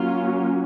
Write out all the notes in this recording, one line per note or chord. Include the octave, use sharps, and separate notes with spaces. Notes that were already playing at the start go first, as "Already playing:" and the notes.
Already playing: F#3 A#3 C#4 F4